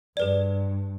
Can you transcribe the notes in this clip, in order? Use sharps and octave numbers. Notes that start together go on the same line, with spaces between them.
G2 G#4 B4 D5